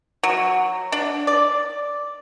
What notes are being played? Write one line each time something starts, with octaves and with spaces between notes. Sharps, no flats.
F#3
D4
D5